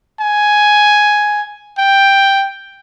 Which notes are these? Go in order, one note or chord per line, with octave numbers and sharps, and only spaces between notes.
G#5
G5